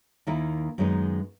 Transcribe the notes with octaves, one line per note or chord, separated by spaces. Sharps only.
D#2 D#3 A#3 E4
F#2 D#3 G#3 B3 D#4